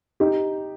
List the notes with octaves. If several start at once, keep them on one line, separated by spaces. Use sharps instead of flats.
D#4 G4